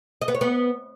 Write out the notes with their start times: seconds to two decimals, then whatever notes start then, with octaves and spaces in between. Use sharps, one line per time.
0.22 D#5
0.28 B3
0.35 C#5
0.41 B3